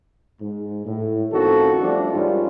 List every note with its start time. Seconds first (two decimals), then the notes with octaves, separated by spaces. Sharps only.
0.41 G#2
0.86 A2
1.33 A1 F2 D#3 B3 F#4 A4
1.81 F3 G3 A3 D4
2.13 G#2 D#3 G3 C#4 F4